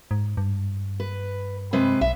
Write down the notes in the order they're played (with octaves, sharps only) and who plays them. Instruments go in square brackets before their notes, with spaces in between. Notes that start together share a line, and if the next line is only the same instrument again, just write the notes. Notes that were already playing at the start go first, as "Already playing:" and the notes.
[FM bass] G#2
G2
[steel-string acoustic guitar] B4
C3 G#3 B4
[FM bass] B1 [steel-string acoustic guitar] E5